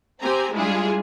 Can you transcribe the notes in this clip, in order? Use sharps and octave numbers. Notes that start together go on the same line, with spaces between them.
C4 G4 C5 G#5 A#5
G3 G#3 D4 E4 F4 G#4